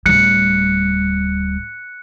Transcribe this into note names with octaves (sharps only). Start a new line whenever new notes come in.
D1 G3 F#6 C#7